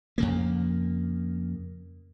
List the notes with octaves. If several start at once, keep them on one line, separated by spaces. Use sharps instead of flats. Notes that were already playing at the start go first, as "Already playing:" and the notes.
F2 C#3 A#3